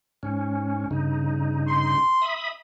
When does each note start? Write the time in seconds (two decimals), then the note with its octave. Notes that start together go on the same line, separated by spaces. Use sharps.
0.23 G#2 C#4
0.91 G2 C#3 D#4
1.67 C6
2.22 E5 B5 D#6